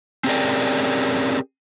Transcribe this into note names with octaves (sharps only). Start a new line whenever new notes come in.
C4 C#4 G4 G#4 A#4 D5